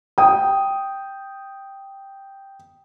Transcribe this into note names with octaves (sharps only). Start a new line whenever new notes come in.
G5 D#6